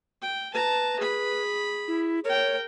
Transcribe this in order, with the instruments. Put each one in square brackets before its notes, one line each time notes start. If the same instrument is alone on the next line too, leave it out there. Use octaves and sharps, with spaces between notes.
[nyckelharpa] G5
[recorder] B4 [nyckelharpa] A5 A#5
[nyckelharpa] G#4 B5
[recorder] E4
[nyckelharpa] A#4 G5 [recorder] C#5